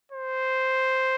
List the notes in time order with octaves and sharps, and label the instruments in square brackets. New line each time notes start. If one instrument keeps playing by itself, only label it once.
[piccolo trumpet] C5